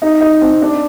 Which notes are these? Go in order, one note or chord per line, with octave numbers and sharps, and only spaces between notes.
D#4
D#4
C4
D4